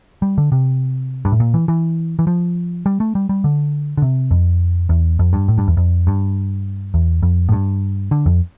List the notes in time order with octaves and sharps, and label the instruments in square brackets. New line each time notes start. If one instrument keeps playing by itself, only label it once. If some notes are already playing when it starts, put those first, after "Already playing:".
[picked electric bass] G3
D3
C3
G2
A2
A#2
E3
E3
E3
F3
G3
A3
G3
G3
D3
D3
C3
F2
E2
F2
G2
A2
G2
E2
F2
G2
E2
F2
A2
G2
D3
F2